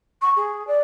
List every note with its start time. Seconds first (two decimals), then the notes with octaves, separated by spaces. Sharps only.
0.22 C#6
0.37 G#4
0.67 D5